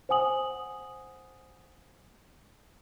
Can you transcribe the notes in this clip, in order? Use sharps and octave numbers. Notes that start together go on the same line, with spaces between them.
C5 F#5 G#5 D#6 F#7